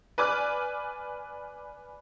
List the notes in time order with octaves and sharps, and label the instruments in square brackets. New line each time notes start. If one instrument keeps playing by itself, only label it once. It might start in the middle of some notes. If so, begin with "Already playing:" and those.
[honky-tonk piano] B4 D5 G#5 D6 F6 F#6